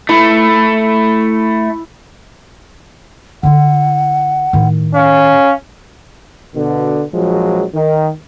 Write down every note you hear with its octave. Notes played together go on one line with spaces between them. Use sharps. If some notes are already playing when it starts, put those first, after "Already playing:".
A3 E4
D3 E4 F#5
A2 D#3
C#4 F5
B2 D3
A#1 F3 F#3 G#3
D#3